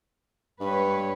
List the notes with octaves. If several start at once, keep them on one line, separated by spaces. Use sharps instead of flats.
G2 B4 C#5